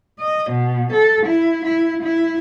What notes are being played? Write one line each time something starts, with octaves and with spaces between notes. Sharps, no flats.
D#5
B2
A4
E4
E4
E4